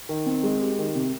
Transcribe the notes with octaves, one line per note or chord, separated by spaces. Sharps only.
D#3
C4
G#3
G4
D#3
C3